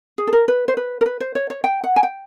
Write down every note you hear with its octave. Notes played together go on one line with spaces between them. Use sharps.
G#4
A4
A#4
B4
C5
B4
A#4
B4
C5
C#5
C#5
G5
F#5
G#5
G5